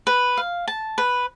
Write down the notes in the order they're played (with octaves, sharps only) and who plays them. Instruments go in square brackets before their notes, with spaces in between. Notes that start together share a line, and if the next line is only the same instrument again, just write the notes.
[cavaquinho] B4
F5
A5
B4